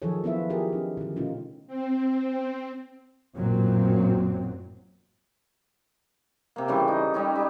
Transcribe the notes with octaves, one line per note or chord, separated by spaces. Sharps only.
D#3 F3 F#3 G#4 A4 C#5
B3 D4 E4 F4 B4 E5
D4 G4 G#4 A#4
C#4 D#4
D3 D#3
B2 A3 C#4 D#4 F4
C4
A1 F#2 A#2 F#3 C4
C3 A#3
C#3 E3 G3 A3
D#4
G3 C#4 D#4
G3